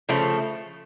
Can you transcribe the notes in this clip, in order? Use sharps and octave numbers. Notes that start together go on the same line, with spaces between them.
C#3 F3 A3